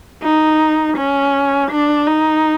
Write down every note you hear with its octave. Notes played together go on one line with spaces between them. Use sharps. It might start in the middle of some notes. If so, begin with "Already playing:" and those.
D#4
C#4
D4
D#4